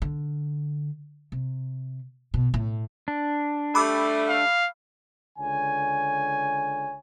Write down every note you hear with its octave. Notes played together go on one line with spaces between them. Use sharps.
D3
C3
B2
A2
D4
G3 A3 B5 D6 E6
F5
C#2 D3 C#5 G#5